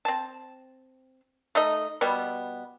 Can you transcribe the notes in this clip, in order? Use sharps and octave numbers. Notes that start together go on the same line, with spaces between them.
C4 A5
A3 D#4 D#5
B2 G3 B3